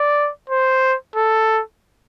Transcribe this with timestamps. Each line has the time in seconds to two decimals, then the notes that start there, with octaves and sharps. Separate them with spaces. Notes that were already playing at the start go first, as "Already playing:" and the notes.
Already playing: D5
0.49 C5
1.15 A4